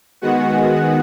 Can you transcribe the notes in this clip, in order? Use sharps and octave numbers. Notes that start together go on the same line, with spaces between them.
D#3 G#3 B3 F#4 F#5